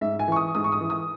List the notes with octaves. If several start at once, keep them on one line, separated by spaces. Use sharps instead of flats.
G#2 E5
G#5
E3 C#6
D#6
G#2 D#6
C#6
D#6
E3
D#6